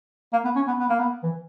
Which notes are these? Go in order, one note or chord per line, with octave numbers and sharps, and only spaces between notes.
A#3
B3
C#4
B3
B3
A#3
B3
E3